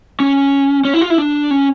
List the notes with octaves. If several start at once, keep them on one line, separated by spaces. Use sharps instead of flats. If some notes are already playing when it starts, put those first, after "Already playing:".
C#4
C#4
E4
F4
E4
D4
C#4